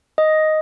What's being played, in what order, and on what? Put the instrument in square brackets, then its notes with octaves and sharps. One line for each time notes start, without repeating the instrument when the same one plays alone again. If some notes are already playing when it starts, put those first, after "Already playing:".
[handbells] D#5